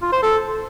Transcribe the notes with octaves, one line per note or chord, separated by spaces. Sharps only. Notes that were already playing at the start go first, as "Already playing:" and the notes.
F4
C5
A4